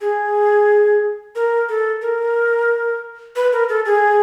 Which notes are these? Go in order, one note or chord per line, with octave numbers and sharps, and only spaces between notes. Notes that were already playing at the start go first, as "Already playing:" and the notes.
G#4
A#4
A4
A#4
B4
A#4
A4
G#4